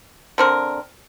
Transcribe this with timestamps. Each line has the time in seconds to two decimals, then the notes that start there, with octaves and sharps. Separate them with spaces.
0.38 D3 C4 A#4